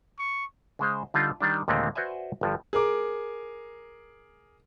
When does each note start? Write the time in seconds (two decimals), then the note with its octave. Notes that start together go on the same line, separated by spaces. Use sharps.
0.19 C#6
0.79 C#3 G#3 C5
1.14 D3 G3 D4 D#4 F4
1.40 D#3 G3 D4
1.68 D#2 A#2 D3 G#3 A3 C4
1.95 F#4 B4 C5 D5 E5 G#5
2.41 G1 G2 F3
2.73 G#4 A#4 D6